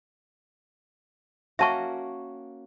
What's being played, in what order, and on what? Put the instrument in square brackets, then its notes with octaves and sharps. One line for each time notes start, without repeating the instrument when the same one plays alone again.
[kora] A#3 C#4 F#4 [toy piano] E5 A5 C#6